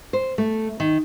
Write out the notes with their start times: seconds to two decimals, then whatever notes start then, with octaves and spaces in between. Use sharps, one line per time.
0.13 C5
0.38 A3
0.80 D#3